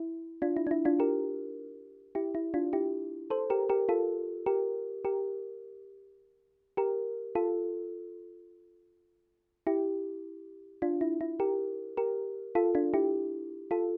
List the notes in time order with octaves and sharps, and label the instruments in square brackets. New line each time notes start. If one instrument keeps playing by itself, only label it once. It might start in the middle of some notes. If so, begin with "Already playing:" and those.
Already playing: [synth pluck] E4
D4 F4
E4
D4
E4
D4 F4
G4 A#4
E4 G4
E4
D4 F4
E4 G4
A4 C5
G4 A#4
G4 A#4
F4 A4
G4 A#4
G4 A#4
G4 A#4
F4 A4
E4 G4
D4 F4
E4
E4
G4 A#4
G4 A#4
F4 A4
D4 F4
E4 G4
F4 A4